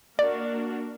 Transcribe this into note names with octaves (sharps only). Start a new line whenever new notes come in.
A#3 D4 F#4 A#4 D5